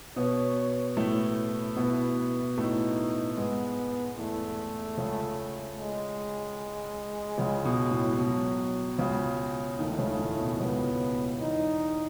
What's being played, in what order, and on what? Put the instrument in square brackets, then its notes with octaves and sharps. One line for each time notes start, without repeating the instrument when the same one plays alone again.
[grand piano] B2 B3 [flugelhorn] C#5
[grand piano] A2 A3 [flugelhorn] E4
[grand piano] B2 B3
[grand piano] A2 A3 [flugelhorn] D#4
[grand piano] G#2 G#3 [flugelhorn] B3
[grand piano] E2 E3 [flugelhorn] A3
[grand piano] C#2 C#3
[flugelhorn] G#3
[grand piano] C#2 C#3
B2
A2
[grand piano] B2 [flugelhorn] F#3
[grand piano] C#2 C#3
[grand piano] D#2 D#3 [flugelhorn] A3
[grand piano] D#3
C#2 C#3
A2
B2
[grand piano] C#2 C#3 [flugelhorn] B3
[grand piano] E2 E3 [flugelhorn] D#4